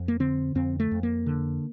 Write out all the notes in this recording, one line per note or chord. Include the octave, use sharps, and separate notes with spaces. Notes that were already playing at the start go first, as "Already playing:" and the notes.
Already playing: F2
A#3
D3 C4
F2 C4
A3
F2
A#3
D3